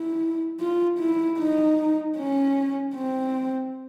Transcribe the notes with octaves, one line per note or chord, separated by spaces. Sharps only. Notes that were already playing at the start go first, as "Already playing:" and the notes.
Already playing: E4
F4
E4
D#4
C#4
C4